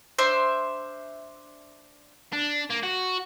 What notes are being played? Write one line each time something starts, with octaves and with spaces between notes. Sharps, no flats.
D4 C5 E5 C6
D4
A#3
F#4